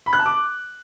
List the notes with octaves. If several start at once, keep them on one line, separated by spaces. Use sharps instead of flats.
B5
F#6
A5
D6